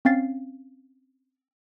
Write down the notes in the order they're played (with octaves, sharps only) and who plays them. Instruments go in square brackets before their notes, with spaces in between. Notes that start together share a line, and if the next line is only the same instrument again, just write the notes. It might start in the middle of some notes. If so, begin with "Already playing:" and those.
[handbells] C4 C#4 F5 A6 C7